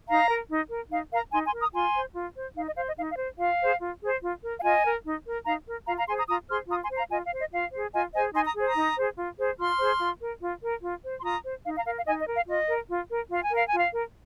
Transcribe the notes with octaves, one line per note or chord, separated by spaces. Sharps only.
D#4 F5 A#5
A#4
D#4
A#4
D#4 F5
A#4 F5 A#5
D#4 G#5 C6
G#5 C6
A#4
A#5 D#6
F4 G#5 C6
C5
F4
C5
D#4 F5
D#5
C5 F5
D#5
D#4 F5
F5
C5
F4 F5
G#4 C5
F4
G#4 C5
F4
A#4
F5
F4 D#5 G#5
A#4
D#4
A#4
D#4 F5 A#5
A#4
F4 F5 A#5
F5 A#5
G#4 C5 G#5 C6
A#5 D#6
F4 A#5 D#6
G#4 C5 C6 F6
F4 A#5 D#6
G#5 C6
C5
F5 A#5
F4 D#5 G#5
F5
C5
D#5
F4 F5
G#4 C5
F4 D#5 G#5
G#4 C5 D#5 G#5
D#4 G#5 C6
A#5 D#6
G#4 C5
A#5 D#6
D#4
G#4 C5
F4
G#4 C5
F4 C6 F6
G#4 C5
F4
A#4
F4
A#4
F4
C5
C6
F4 A#5 D#6
C5
D#4 F5
F5 A#5
A#4 F5
F5
D#4 D#5 G#5
D#5
A#4
F5
F4 D#5
A#4
F4
A#4
F4 F5
G#5
A#4 F5
G#5
F4 F5
A#4